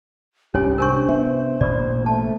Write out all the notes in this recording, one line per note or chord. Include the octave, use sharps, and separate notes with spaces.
C2 G#2 C#4 G4 C#5 G#5
C3 D4 A#4 C5 G#5 C#6 G6
B3 E5
A1 A#2 D5
A3 A5